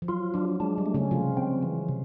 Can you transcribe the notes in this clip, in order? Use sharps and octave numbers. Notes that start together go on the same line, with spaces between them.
F3
F#3 F4
F#3 D4
G#3 D4
G3
A3
C#3 C#4
C3 F3 F4
C4
E3
C3